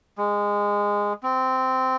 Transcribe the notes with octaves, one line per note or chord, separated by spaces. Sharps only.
G#3
C4